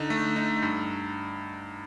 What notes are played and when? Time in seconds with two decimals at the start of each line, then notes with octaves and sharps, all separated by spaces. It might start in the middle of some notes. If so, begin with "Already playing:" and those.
Already playing: D3 D#4
0.10 A3
0.36 D#4
0.62 G2